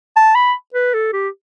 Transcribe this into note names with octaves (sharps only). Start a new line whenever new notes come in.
A5
B5
B4
A4
G4